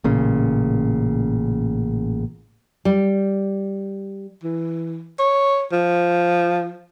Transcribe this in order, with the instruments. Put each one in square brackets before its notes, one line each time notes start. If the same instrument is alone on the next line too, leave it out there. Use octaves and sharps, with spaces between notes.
[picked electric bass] A1 A#2 C#3
[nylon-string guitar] G3
[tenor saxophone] E3
C#5
F3